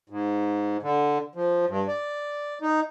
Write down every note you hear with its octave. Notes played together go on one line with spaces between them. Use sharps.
G#2
D3
F3
G2
D5
D#4